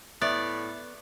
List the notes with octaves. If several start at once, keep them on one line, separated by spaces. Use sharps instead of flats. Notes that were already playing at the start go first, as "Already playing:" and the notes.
A2 B3 E4 D5